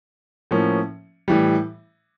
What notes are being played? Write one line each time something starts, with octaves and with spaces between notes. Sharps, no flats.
A2 F3 A#3 C#4
A2 E3 G3